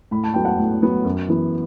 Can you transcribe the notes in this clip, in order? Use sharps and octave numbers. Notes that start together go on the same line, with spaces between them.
A2 B5
A5
F#3 B3 G5
F#5 A5
A2
F#3 B3
F#2
E3 B3